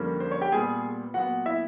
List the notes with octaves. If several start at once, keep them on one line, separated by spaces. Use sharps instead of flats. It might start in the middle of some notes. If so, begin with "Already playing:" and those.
Already playing: F2 D3 G3 A#3 C#4
C5
C#5
G4 G5
A#2 G3 B3 G#4 G#5
A#2 F#3 B3 F#4 F#5
E4 E5